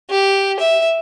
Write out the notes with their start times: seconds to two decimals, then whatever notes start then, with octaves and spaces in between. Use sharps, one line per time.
0.10 G4
0.60 E5